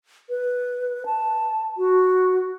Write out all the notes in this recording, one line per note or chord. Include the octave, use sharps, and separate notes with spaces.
B4
A5
F#4